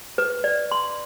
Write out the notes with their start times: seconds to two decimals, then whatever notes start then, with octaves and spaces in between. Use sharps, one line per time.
0.18 B4
0.44 D5
0.71 C6